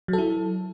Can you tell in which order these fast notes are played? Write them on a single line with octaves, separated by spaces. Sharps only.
F#3 A4 E4